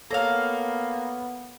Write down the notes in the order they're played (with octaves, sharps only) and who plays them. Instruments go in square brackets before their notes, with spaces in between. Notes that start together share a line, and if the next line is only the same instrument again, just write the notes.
[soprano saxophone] A#3 [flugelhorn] B3 [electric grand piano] A4 C#5 [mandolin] F5 A#5